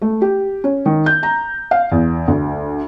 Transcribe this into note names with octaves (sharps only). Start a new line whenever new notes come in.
A3
G4
C#4
D#3
G6
A#5
F5
E2
D2